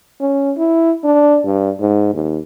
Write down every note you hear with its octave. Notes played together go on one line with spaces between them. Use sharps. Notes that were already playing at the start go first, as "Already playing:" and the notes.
C#4
E4
D4
G2
G#2
D#2